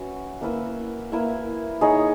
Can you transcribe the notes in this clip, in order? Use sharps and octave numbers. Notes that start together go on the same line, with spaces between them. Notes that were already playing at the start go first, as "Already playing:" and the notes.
Already playing: C#4 F#4 B4 E5
A#3 E4 B4 E5
A#3 E4 B4 E5
D#4 G#4 C#5